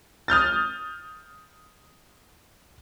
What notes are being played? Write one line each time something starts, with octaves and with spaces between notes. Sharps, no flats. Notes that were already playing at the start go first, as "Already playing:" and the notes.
D#6 F6 G6 A6